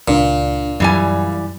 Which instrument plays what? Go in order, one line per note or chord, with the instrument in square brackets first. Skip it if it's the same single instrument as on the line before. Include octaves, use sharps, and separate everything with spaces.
[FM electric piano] C#2 D4 [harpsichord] A#2
[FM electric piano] F#2 [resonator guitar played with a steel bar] E3 G3 G#5